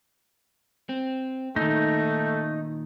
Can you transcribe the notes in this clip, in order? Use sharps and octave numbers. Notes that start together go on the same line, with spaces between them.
C4
A#2 D#3 A3 D#4